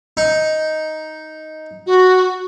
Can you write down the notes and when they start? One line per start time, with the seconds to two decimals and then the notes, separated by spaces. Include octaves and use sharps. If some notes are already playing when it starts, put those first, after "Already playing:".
0.17 D#4
1.87 F#4